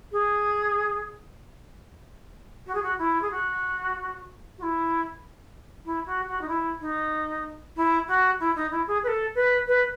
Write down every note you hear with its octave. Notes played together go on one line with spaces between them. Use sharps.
G#4
F#4
G#4
F#4
E4
G#4
F#4
F#4
E4
E4
F#4
F#4
D#4
E4
D#4
E4
F#4
E4
D#4
E4
G#4
B4
A4
B4
B4